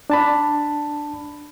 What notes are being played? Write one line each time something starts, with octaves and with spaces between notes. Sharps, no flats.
D4 A5 B5